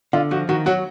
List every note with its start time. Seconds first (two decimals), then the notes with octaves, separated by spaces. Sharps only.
0.13 D3 F4
0.31 F3 F#4
0.49 D#3 F#4
0.66 F#3 F#4